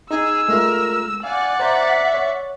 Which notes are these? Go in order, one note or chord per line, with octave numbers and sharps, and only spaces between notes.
D#4 G#4 E6
G#3 A3 F4 A#4
D5 F5 F#5 G#5
C5 E5 A#5 G6
C#5